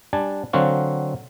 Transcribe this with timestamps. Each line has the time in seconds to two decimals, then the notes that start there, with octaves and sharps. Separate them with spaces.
0.13 G3 D4 G#5 A5
0.53 D3 F#3 C4 F#4 F5